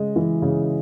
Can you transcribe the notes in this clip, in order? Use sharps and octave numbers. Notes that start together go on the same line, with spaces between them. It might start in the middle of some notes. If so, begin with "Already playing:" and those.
Already playing: C#3 G#3 D#5
E3
C#3